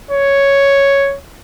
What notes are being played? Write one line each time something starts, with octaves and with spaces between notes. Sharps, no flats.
C#5